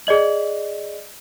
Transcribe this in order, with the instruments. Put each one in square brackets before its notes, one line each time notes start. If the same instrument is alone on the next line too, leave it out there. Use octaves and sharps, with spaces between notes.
[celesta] G#4 D5 D#5 F#7